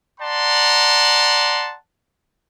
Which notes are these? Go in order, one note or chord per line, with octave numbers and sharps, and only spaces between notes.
D5 F#5 A5 A#5 C6